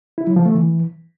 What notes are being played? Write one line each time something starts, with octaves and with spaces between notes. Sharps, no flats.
E4
F#3
F3
A3
E3